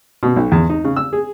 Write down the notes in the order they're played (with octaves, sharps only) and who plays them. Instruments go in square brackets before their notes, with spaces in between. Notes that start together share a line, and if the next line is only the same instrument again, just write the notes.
[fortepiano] B2
B1
E2
D#4
C#3
E6
G#4